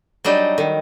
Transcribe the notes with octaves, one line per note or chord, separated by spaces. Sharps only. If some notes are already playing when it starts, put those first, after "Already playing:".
F#3 G3 D4 D#4
D#3